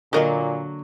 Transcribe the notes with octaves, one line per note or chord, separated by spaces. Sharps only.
A#2 D3 F#3 A#3 F#4 A#4 D#5